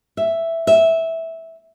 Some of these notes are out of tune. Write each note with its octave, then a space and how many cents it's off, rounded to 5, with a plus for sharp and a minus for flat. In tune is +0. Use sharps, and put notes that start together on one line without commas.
E5 +5
E5 -10